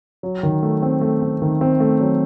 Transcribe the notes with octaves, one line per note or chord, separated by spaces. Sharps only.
F#3
D#3
A3
C4
A3
C4
D#3
C4
A3
F#3